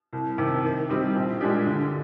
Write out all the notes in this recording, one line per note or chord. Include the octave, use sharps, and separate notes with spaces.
C2
C3 D#3
D#3
G3 C4 D#4 G4
A#1
A#2 G#3 D4 G4
D3